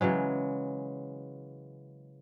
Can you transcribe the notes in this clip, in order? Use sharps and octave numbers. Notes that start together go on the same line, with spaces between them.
C#3 E3 F#3 G#3